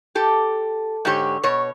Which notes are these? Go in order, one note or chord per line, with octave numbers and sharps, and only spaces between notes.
G4 A4
G#2 D3 G4 C#5
B2 C#5